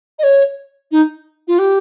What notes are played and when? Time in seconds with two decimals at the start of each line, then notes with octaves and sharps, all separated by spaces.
0.19 D#5
0.23 C#5
0.91 D#4
1.47 F4
1.58 G4